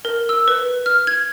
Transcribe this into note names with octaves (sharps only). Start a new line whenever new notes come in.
A#4
E6
B4
F6
G#6